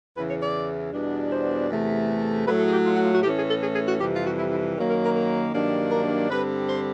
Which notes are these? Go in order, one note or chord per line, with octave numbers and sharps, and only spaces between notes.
E2 C#3 E3 B4
C#5
D5
E2 B2 G3 B3 D4
C5
E2 C3 E3 A3
A2 F#3 A3 B4
A4
G#4
G4
F4
F#4
F4
F#4
A2 E3 A3 C#4 G4
G#4
A4
G#4
G#4
F#4
F2 C3 E3 G3 G4
F4
F#4
E4
E4
F#2 D#3 F#3 A#3
A#4
A#4
A#4
G2 D#3 F#3 A#3 D4
A#4
G2 D3 G3 C4 B4
C5